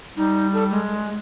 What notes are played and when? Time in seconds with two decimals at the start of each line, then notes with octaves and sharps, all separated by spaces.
0.17 G3 D#4
0.53 A4
0.71 G#3